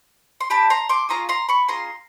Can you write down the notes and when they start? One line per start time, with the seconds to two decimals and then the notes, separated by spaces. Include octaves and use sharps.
0.40 C6
0.50 D4 G4 A5 B5
0.70 A#5 C6
0.89 C6 D6
1.09 C#4 F4 G#4 A#5 C6
1.29 A#5 C6
1.49 B5 C#6
1.68 C#4 F4 G#4 A#5 C6